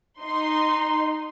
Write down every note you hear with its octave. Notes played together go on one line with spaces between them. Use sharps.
D#4 C6